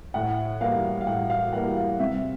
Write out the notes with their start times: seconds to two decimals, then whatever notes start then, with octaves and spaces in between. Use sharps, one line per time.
0.14 A2 F#5
0.61 E3 G3 A#3 F5
1.01 F5
1.07 A2 F#5
1.30 F5
1.53 E3 G3 A#3 F#5
1.77 F5
1.99 C3 E5